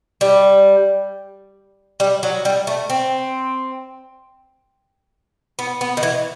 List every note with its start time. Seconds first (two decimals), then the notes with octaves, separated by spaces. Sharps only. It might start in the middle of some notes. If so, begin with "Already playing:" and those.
0.21 G3
2.00 G3
2.23 F#3
2.45 G3
2.67 A3
2.90 C4
5.59 B3
5.81 B3
5.97 D#3
6.03 E3